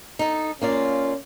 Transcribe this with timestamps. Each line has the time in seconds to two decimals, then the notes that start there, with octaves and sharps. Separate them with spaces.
0.19 D#4 A4
0.62 A#3 C#4 F4 D5